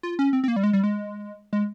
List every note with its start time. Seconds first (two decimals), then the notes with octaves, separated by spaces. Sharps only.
0.03 F4
0.19 C#4
0.33 C4
0.44 C4
0.48 A#3
0.56 G3
0.64 G#3
0.73 G3
0.84 G#3
1.53 G#3